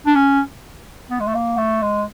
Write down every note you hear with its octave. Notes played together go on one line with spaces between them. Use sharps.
D4
C#4
B3
G#3
A3
A#3
A3
G#3